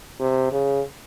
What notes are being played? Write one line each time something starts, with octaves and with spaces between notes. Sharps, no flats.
C3
C#3